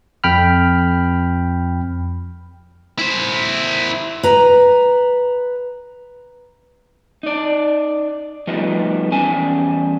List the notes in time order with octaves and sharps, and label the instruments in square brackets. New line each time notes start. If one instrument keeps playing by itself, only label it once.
[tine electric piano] F2 G5 B5 F6
[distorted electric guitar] E4 C5
[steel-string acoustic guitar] B4 A#5
[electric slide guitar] D#4 D5
F3 G3 A3 B3 D#4 F4
E2 G3 C#4 G#5 A5